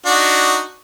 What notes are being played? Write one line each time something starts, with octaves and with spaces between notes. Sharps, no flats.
D4 D#4 F#4